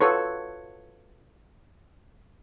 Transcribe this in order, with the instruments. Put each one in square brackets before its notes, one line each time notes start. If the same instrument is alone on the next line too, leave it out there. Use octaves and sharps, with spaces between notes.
[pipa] F4 F#4 C#5 [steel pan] A4 B4